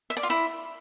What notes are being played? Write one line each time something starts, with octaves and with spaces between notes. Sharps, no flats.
E5
D5
F4
E4